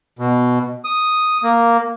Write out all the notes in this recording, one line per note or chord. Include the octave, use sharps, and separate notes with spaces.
B2
D#6
A#3